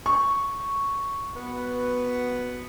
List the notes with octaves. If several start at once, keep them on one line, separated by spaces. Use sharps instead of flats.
C#6
B3 F#4 B4